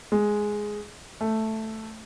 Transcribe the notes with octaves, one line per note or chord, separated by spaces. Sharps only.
G#3
A3